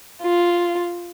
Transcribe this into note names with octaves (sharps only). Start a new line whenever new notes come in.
F4